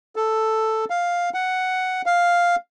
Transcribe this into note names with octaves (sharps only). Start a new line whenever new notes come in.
A4
F5
F#5
F5